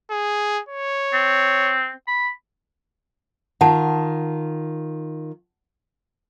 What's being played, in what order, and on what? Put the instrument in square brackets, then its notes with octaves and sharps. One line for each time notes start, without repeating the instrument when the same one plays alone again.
[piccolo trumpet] G#4
C#5
[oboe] C4
B5
[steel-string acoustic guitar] D#3 F4 [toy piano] F#5 A5